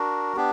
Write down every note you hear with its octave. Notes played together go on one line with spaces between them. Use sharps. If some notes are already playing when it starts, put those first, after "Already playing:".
Already playing: D4 F#4 A#4
B3 D4 G4